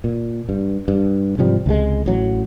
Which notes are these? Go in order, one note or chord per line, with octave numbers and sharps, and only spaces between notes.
A#2
G2
G2
G#2 C3 F3 G3
C#2 C3 D#3 G#3
A1 F#3